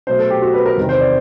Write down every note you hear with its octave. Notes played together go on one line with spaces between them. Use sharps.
B2 F#3 A3 C5
A4
G4
F#4
B4
A#4
E2 C3 D#3
C5
D5